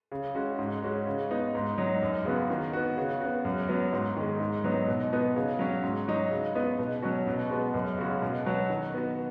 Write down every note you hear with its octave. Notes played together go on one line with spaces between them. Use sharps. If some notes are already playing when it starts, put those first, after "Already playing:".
C#3
G#3 C#4 F#4
G#2
G#3 C#4 F#4
C#3
B3 D#4
G#2
F#3 D#4 F#4
F#2
C#3 B3 F#4
D#3
B3 F#4
C#3
B3 F#4
F#2
F#3 B3 F#4
G#2
D#3 G#3
G#2
F#3 B3 D#4 F#4
B2
B3 D#4 F#4
C#3
F#3 C#4 F#4
G#2
F#3 D#4
C#3
B3 D#4
B2
F#3 C#4 F#4
B2
G#3 B3 F#4
F#2
C#3 G#3 C#4 F#4
B2
F#3 B3 F#4
D#3
B3 F#4